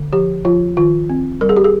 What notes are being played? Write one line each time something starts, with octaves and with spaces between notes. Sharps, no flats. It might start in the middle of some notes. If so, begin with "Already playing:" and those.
Already playing: D3
F3 G4
F3 F4
D#3 F4
C4
G3 A#4
G#4
G4
G#4